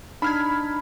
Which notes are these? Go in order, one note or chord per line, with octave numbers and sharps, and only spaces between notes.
D4 D#4 B5 F6 G#6